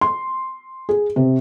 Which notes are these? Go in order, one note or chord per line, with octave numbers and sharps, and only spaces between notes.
C6
G#4
C3